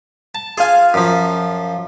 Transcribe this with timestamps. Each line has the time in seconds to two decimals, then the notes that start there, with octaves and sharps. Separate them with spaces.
0.35 A5
0.58 F4 G#4 F5 G#5
0.94 F#2 F3